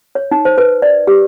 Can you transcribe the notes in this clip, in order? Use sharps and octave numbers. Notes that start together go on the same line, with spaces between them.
C#5
D#4
C5
B4
D5
G4